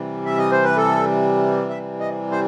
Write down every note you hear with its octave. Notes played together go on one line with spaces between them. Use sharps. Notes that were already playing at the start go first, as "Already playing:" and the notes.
Already playing: C3 E3 G3
E5
D#5
C5
B4
A4
E5
D#5
C5